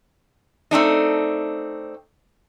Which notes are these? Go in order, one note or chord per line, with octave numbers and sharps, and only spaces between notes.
A3 C4 D4 D#4